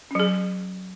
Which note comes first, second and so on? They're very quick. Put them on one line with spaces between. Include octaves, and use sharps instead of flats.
C#4 F#3 G#4